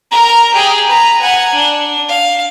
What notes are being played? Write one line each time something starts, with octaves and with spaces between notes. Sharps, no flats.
A#4 A#5
G4 G#4
B4 A#5
F#5 G#5
D4
F5